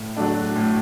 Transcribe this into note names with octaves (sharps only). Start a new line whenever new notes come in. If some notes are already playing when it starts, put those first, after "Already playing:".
Already playing: A2
F#3 A3 D4
A2